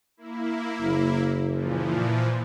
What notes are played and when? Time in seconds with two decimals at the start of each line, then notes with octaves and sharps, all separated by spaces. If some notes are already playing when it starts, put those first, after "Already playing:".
0.17 A#3 E4
0.81 F#1
1.48 A#2 E3 F3